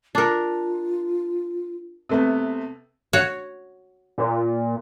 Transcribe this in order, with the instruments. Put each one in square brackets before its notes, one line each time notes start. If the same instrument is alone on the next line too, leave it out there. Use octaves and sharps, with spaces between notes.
[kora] D4 A#4 [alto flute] F4
[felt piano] C3 A3 B3
[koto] F#4 C#5
[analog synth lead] A#2